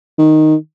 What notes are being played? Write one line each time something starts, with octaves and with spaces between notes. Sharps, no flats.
D#3